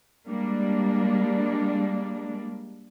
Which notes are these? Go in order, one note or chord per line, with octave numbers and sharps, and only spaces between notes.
G3 G#3 A#3 D4